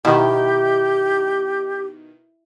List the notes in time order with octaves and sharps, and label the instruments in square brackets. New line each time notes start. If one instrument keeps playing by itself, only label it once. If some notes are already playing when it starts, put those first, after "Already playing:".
[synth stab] B2 D#3 [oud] E4 [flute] G4